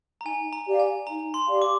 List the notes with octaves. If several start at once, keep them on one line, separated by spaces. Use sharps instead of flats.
A#5
D#4 G#5
A#5
G4 D5 F5
G#5
D#4 A#5
C6
G4 D5 F5
D6